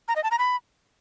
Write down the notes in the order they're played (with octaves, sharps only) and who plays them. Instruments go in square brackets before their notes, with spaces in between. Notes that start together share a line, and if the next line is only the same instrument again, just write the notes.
[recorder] A#5
D#5
A5
A#5
B5